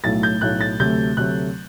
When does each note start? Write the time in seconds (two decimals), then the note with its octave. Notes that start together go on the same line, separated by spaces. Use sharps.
0.04 B1 A2 F#3 A3 A6
0.23 G6
0.41 B1 A2 F#3 A3 F#6
0.61 A6
0.79 D2 C3 F#3 A3 G6
1.17 D2 C3 F#3 A3 F#6